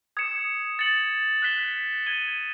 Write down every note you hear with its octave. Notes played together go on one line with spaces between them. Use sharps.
D#6 G#6 C#7 E7
A6 C#7 F#7
F#6 B6 E7 G7
G#6 B6 D#7 G7